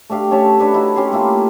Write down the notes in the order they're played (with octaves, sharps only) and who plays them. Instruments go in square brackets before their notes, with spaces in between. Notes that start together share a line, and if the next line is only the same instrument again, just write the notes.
[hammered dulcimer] A3 D4 G4 F5
C#4 C#5 E5 A5
D4 B4 C#5
D#4 E4 F#4
C#4 G4 C6
A3 A#3 E4 F4